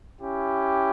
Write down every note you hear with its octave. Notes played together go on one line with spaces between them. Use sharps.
C#4 E4 G4